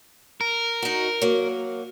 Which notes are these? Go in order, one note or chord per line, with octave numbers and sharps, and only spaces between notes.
A#4
D#4 F#4
F#3 A#3